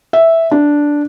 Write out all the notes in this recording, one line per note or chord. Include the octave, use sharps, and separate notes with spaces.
E5
D4